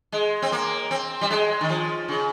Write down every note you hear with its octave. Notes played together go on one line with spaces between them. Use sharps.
G#3
C4
A#3
C4
G3
G#3
D#3
F3
C#3